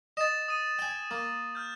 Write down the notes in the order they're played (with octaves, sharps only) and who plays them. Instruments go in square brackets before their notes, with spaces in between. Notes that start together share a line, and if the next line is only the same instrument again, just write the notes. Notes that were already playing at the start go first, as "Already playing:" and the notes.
[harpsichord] D#5 [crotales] A6 E7
[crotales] D#6 D#7
[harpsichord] G5 G#5
A#3
[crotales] F6 G6